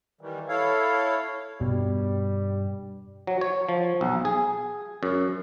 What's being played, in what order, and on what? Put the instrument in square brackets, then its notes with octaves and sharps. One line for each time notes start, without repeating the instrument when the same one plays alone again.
[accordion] D#3 E3 G3
E4 A4 C#5 F5
[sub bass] G2 [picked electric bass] B2 [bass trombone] G3
[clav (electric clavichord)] F#3
C#5
F3
B1
G#4
F#2